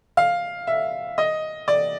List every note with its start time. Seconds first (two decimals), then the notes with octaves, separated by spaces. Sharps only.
0.17 F5
0.67 E5
1.18 D#5
1.68 D5